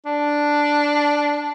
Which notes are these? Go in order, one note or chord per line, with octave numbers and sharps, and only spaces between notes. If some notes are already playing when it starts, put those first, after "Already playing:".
D4